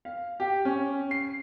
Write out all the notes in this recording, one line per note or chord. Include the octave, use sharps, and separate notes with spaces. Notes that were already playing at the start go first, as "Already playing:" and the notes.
F5
G4
C#4
C7